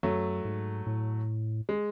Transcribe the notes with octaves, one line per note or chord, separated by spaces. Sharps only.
F#2 F#3 A3
G#2
A2
G#3